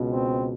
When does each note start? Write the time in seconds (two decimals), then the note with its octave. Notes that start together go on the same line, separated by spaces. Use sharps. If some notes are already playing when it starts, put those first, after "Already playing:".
Already playing: C#2 B2
0.11 C4